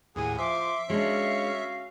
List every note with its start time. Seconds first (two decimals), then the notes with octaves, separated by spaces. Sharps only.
0.16 D#2 A2 G#4 F#5 G#5
0.39 F3 E5 C6 D6
0.90 G#3 C#4 D4 F#4 C#5 F5